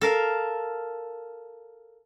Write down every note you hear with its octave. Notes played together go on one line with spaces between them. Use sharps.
A4 A#4 F5